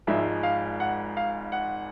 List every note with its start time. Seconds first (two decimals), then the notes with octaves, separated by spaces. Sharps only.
0.07 G#1 G#2 F3 G#3 E5
0.43 F5
0.80 F#5
1.17 F5
1.52 F#5